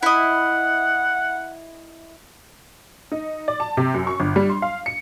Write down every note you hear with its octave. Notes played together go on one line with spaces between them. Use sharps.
E4 D#5 F#5
D#4
D5
A5
C3
F#2
C#6
G1
G3
C6
F5
C#7